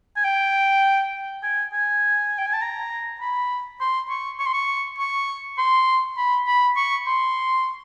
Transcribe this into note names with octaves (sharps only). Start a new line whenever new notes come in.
G#5
G5
G#5
G#5
G5
G#5
A5
A#5
B5
C6
C#6
C#6
C6
C#6
C#6
C6
B5
B5
C#6
C6